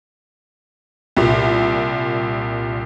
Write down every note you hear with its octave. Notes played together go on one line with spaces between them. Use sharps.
C2 A#2